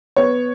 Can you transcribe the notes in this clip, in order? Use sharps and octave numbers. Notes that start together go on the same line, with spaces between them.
B3 C#5